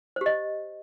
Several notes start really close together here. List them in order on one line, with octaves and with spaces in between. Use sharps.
C5 G4 D#5